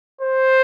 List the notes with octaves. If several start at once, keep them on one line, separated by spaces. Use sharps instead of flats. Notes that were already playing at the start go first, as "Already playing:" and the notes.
C5